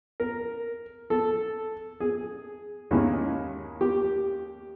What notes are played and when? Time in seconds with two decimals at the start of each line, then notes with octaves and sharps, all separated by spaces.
0.20 A#4
1.10 A4
2.00 G#4
2.91 D#2 D#3 G#3 C#4 E4
3.81 G4